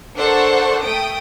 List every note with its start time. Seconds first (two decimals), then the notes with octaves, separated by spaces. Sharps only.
0.17 D4 A4 A#4 C5 F#5 C#6
0.83 A3 G5 D#6 D7